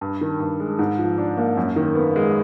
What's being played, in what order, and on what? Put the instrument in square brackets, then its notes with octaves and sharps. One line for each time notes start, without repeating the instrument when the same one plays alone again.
[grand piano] G2
D#3
G2
G#3
G#2
F3
D4
A#3
F#2
D#3
B3
G#3